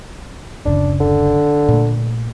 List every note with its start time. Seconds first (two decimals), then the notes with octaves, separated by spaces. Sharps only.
0.65 D1 F#2 C#3 D4
1.00 D3
1.69 A#2 A3